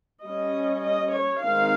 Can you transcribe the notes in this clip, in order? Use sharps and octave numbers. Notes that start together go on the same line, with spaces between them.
G3 C#4 D#5
D#5
C#5
D#3 G#3 C4 D#4 F5